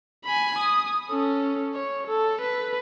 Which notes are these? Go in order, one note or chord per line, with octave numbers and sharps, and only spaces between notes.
G#5 B5
D#6
C#4 A4
C#5
A4
B4